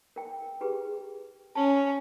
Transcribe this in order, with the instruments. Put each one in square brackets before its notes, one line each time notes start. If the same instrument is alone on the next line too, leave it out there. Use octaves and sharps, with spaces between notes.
[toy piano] A#4 G5
G4 G#4 B4
[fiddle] C#4 [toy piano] A5